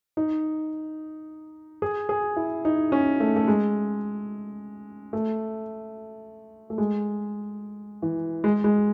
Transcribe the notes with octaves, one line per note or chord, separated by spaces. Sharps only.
D#4
G#4
G#4
E4
D#4
C#4
A3
A3
G#3
A3
A3
G#3
E3
G#3
G#3